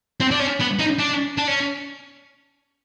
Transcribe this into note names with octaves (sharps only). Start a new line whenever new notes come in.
C4
D4
C#4
B3
D#4
D4
D4
C#4